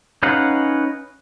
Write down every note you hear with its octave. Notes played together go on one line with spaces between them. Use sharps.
C#4 D#4 B4 F5 F#5